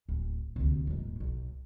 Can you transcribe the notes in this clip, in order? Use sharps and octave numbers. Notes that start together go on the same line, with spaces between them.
D1
D2 C3
D#1 G#2
B1